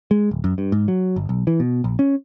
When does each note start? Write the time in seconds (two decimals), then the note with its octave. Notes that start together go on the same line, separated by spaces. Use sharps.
0.11 G#3
0.31 D1
0.44 F#2
0.58 G2
0.72 G#2
0.88 F#3
1.16 G1
1.29 B1
1.47 E3
1.60 B2
1.84 A#1
1.99 C#4